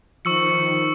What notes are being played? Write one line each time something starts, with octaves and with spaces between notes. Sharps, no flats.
D#3 F3 C#6 E6 C#7